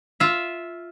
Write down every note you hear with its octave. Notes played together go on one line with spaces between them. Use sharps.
F4 E5